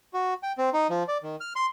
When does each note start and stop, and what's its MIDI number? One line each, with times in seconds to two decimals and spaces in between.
0.14 0.34 66
0.43 0.52 79
0.58 0.70 60
0.73 0.87 63
0.90 1.03 53
1.08 1.18 74
1.23 1.36 51
1.40 1.53 89
1.56 1.66 84